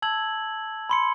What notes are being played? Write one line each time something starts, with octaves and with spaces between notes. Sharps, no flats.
A5 E6 G#6 F#7
B5 C6 C#7